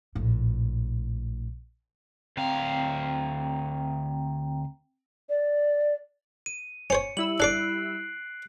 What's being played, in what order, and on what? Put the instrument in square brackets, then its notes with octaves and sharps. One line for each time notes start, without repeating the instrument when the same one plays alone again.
[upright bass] A#1 A2
[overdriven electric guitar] D2 F5 [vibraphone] C4 G5 A#5
[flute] D5
[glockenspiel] D#7
[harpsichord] C#4 C5 C#5 [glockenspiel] C#7
[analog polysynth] G3 E4 E6 [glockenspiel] F#7
[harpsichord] D4 A4 D5 [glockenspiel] F#6 C7 D7